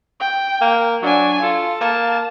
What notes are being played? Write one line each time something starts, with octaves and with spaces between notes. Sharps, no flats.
G5
A#3
F#3 D4 G#5
F4 A4
A#3 A5